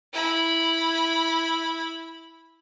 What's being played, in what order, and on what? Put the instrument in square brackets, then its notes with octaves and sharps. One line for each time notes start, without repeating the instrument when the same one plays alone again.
[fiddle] E4 B5